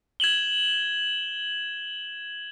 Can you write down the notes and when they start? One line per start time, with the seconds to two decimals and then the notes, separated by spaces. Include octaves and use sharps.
0.20 G#6 E7 F#7 G7